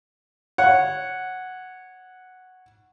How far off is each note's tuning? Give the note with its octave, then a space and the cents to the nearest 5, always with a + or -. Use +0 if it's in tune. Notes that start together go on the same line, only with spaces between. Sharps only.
C#5 -10 F#5 +0